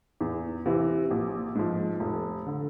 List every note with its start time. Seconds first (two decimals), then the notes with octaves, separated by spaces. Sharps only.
0.21 E2
0.66 C3 E3
1.11 A#1
1.55 G#2 F3
2.00 F1
2.46 D3